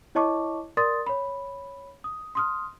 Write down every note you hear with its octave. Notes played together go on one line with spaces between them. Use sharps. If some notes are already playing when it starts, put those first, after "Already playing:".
E4 C#5 D#5 A5 C#6 D6
A#4 D5 C6 D#6 A6
C#5 B5
D#6
C6 D#6 F6